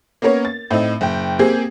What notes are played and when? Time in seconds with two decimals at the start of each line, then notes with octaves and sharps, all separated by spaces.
0.22 A#3 B3 C#4 A#4 C#5
0.45 A6
0.71 A2 C4 D#4
1.01 F#1 G5
1.39 A#3 C4 G4 G#4